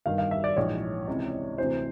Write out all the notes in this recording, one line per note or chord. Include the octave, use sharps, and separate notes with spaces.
G1 G2 D#3 F5
F5
E5
D5
A#1 G#2 E3 C#5
C#2 C3 E3
D2 C3 E3 C5